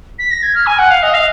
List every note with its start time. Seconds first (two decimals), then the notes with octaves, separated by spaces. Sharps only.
0.19 B6
0.31 A#6
0.43 G#6
0.55 F6
0.66 G#5
0.79 F#5
0.90 F5
1.03 D#5
1.14 F5